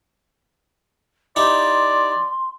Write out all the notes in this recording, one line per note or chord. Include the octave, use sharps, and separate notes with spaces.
D#4 E4 G4 D5 C6